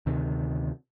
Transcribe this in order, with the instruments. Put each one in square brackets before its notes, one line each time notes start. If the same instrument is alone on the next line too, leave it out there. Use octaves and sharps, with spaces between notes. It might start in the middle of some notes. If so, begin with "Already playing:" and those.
[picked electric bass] D2 C3 D#3